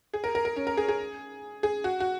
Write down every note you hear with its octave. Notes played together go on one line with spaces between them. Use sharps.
G#4
A#4
A#4
A#4
C#4
A#4
G#4
G#4
G#4
F#4
F#4